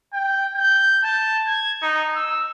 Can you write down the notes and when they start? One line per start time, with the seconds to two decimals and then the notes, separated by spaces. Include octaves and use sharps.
0.13 G5
0.55 G6
1.03 A5
1.47 G#6
1.82 D#4
2.15 E6